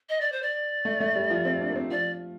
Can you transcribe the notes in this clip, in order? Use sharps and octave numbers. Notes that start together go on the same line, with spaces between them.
D#5
D5
C5
D5
A3
A3
G3
F3
C4
D4
A#3
C4
F3 D5